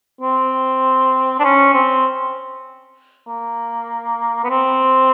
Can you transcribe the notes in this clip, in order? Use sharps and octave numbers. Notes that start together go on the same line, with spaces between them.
C4
D4
C#4
C4
A#3
B3
C4